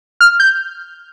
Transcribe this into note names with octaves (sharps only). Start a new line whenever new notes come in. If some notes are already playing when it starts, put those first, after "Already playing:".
F6
G6